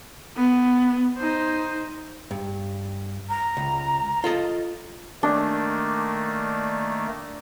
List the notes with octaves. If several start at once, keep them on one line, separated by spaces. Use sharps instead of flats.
B3
D#4 C5
G2
A#5
C#2
F4 A4 D#5
D#3 A3 A#3 D4